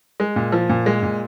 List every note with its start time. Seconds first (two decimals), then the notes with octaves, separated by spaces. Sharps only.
0.20 G#3
0.36 A#2
0.52 F3
0.69 A#2
0.86 G#3
1.03 A#2